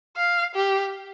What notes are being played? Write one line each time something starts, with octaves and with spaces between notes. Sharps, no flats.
F5
G4